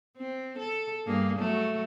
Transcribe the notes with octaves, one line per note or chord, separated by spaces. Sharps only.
C4
A4
G2 A#3 G#4
F#3 A3